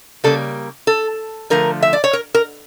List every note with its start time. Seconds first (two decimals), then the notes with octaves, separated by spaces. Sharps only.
0.24 C#3 G3 A#3 A4
0.87 A4
1.50 D3 F3 A3 A#4
1.83 E5
1.93 D5
2.04 C#5
2.13 A#4
2.34 A#4